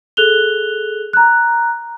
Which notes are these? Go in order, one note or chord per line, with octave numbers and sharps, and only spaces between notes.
G#4 A4 F#6 F7 G7
A#5 F#6